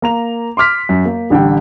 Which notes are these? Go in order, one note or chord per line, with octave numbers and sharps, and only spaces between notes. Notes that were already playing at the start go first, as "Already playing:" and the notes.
A#3 A#5 F7
C6 D6 F6 B6
F#2
A#3
A1 D3 G3 G5